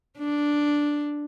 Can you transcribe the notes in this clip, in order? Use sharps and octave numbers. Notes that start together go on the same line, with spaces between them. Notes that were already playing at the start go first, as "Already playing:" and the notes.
D4